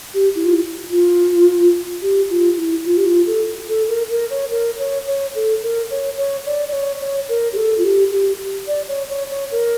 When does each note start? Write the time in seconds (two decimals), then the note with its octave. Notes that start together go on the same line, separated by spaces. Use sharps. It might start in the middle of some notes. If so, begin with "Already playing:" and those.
0.14 G4
0.35 E4
0.45 F4
0.53 E4
0.91 F4
2.02 G4
2.30 F4
2.57 E4
2.85 F4
2.97 G4
3.06 F4
3.26 A4
3.68 A4
3.88 A#4
4.10 A#4
4.30 C#5
4.51 A#4
4.79 C#5
5.07 C#5
5.35 A4
5.63 A#4
5.91 C#5
6.18 C#5
6.46 D5
6.69 D5
6.73 C#5
7.01 C#5
7.29 A#4
7.53 G4
7.57 A4
7.78 F4
7.84 G4
8.12 G4
8.67 D5
8.88 C#5
9.09 C#5
9.30 C#5
9.52 A#4